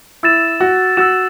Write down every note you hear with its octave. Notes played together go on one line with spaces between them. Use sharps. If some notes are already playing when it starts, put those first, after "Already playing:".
E4 E6 A6 E7
F#4
F#4 E6 A6 E7